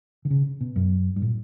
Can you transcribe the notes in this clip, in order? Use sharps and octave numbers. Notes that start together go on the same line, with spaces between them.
D3
C#3
B2
F#2
G2
A#2